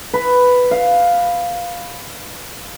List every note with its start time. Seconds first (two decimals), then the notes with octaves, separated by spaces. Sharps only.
0.14 B4
0.71 F5